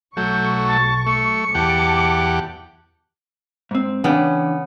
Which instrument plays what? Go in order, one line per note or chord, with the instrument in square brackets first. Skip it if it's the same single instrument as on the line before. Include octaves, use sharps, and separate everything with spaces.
[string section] B1 C#6 [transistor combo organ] F#3 A3 [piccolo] G6
[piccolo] A5
[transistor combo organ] A3 [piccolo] C#7
[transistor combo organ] E2 G4 F#5 [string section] A5 D6
[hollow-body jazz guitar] G#2 C4
[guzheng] C#3 B3 [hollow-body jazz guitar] E3 D4 G5